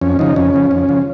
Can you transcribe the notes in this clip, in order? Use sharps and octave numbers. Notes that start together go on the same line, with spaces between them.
F2 C#4
C#3 F3 D#4
F2 C#4
C#3 F3
F2
C#3 F3